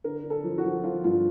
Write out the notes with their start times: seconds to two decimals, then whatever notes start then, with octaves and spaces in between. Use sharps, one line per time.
0.04 D3 A#4
0.24 D3
0.30 A4
0.44 F3
0.58 F#4
0.64 F3
0.84 F3 F4
1.04 G2 F4